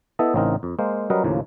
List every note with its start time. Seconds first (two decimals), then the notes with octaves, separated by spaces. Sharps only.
0.19 B3 E4 A4 D#5 E5
0.34 A1 C#3 C4 D#4 A#4
0.63 F2
0.79 G#3 A#3 C5 F5
1.10 F#3 G3 C#4 A#4 B4 D#5
1.24 D#2 A2 C#3 F3 A#3